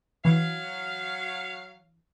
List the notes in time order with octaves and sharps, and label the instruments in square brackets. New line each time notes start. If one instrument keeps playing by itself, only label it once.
[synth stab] E3 [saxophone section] F#3 F5